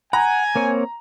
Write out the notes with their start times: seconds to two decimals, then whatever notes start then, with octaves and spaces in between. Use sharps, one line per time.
0.13 F#5 G#5 A#5
0.56 A#3 C4 C#5